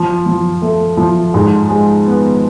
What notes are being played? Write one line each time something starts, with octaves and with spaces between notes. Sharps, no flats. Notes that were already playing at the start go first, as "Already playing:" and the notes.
Already playing: F3
F3
A3
F3
G#2
G#3
B3